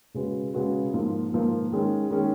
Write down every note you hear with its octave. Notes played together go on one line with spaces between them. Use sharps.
C#3 G#3 C#4 F#4 B4
C#3 G#3 C#4 F#4 B4
G#2 F3 A#3
G#2 F3 A#3
D#3 G#3 C#4
D#3 G#3 C#4